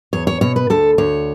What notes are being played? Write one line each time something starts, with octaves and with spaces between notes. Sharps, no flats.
E2 C#5
C#5
B2 C#5
B4
D2 A4
D2 C#5